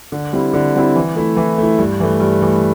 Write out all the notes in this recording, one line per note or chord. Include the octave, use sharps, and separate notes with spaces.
D3
G3 C4 E4
D3
G3 C4 E4
E3
A3 E4
E3
A3 E4
G2
E3 A3
G2
E3 A3